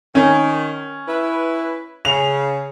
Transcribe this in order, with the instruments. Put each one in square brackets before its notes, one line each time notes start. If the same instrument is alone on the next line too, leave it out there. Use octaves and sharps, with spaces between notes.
[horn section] D#3 [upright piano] C#4
[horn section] E4 B4
[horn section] C#3 [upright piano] F7